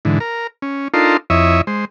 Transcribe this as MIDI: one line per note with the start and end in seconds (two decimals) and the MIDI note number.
0.05 0.19 44
0.05 0.19 50
0.05 0.19 52
0.20 0.47 70
0.62 0.88 61
0.94 1.17 62
0.94 1.17 63
0.94 1.17 65
0.94 1.17 69
0.94 1.17 70
0.94 1.17 84
1.30 1.61 41
1.30 1.61 64
1.30 1.61 73
1.30 1.61 75
1.30 1.61 76
1.67 1.85 56
1.67 1.85 72